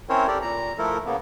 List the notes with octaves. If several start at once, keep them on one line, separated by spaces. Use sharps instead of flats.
C4 C#4 E4 A#4 C5 C#5
G4 A4 A#4 D5
A#2 A#5
F3 A3 E4 A4 A#4
C#3 A#3 B3